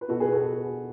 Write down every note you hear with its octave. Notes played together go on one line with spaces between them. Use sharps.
B4
B2 F#4 A4
G#4 B4
F#4 A4